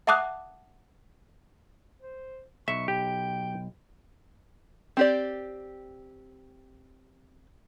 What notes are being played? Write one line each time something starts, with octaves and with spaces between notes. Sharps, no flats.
E5 F#5 A5 D6 D#6 F#6
C5
B1 E5 C#6
G4 G5
C4 G4 D5